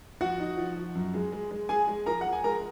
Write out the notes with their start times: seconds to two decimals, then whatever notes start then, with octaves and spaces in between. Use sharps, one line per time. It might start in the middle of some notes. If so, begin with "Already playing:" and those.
0.21 F3 F#4 F#5
0.40 D#4
0.58 F3
0.77 F3
0.95 F#2
1.14 G#3
1.32 G#3
1.51 G#3
1.69 G#3 G#4 G#5
1.88 G#3
2.06 F3 A#4 A#5
2.21 F3 F#5
2.33 G#5
2.44 G#3 A#4 A#5